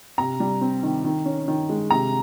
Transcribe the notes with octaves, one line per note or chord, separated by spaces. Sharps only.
C3 A#5
G3
C4
D#3
D#3
C#4
D#3
G#3
C3 A#5